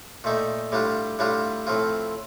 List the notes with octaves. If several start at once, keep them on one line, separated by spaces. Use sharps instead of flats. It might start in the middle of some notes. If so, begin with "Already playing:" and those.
A#2 A3 D#4
A2 G3 D4 F4
A2 G3 D4 F4
A2 F3 C4 F4